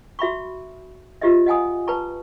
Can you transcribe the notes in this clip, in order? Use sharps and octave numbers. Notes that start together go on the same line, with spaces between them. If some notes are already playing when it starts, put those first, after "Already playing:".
F#4 E5 B5 C#6
F4 G4 C5 D#5 E5
D#5 F5 F#5 G#5 A#5 D#6
B4 A5 A#5 C#6